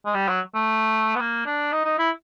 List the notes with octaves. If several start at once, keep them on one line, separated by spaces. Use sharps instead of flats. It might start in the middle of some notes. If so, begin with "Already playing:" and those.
G#3
G3
F#3
A3
B3
A#3
D4
D#4
D#4
E4